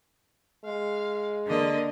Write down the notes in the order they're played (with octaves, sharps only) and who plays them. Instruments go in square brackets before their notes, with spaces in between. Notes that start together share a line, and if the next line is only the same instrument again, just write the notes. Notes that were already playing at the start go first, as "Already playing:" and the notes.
[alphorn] G#3 [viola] F5
[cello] D3 [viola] A#3 D#5